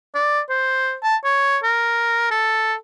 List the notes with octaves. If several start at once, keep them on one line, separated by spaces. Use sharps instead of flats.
D5
C5
A5
C#5
A#4
A4